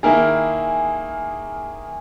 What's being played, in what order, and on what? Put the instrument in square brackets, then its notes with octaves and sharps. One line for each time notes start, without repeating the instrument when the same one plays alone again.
[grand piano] D#3 A#3 E4 A#4 [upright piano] G#4